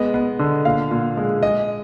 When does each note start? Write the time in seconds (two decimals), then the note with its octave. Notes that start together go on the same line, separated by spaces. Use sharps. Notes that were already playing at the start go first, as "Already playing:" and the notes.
Already playing: G#3 B3 D#5
0.14 B3
0.39 D3
0.65 A#2 F5
0.91 A#2
1.17 G#3
1.43 G#3 D#5